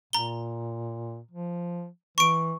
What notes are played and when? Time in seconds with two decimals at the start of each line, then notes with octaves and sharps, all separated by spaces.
0.13 A#2 A#5 G7
1.32 F3
2.18 E3 C#6 D7